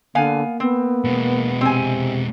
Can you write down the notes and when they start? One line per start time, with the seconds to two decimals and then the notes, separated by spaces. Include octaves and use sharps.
0.15 D3 A#3 B3 F5 G#5
0.60 B3 C4
1.05 B2 G#3
1.61 C3 C4 G#5